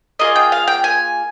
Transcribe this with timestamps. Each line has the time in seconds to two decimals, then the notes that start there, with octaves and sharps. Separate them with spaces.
0.19 A#3 F4 G#4 D#5
0.36 G5
0.52 F5
0.68 G5
0.84 G#5